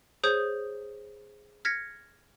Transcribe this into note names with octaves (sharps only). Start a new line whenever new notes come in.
G#4 C5 C#5 D#6 G6
F6 G#6 A#6 B6 C#7